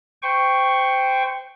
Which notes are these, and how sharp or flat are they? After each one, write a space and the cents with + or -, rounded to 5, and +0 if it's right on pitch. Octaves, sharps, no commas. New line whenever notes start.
C5 -20 G5 +0 C#6 +0